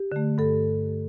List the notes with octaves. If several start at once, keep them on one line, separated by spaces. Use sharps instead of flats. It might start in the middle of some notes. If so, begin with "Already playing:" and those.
Already playing: G4
D3 A3
G2 A4